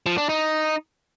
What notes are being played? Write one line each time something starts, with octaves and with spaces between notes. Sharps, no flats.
F3
D4
D#4